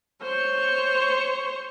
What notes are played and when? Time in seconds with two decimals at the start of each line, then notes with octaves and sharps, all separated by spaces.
0.23 C5 C#5 C#6